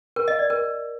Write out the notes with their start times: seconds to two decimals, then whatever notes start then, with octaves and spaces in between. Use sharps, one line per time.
0.16 A#4
0.28 D#5
0.39 D5
0.50 A#4